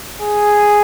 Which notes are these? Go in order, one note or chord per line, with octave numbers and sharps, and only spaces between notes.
G#4